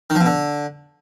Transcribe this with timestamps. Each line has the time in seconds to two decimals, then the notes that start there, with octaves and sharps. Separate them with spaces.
0.10 D#3
0.15 F3
0.21 B2
0.26 D3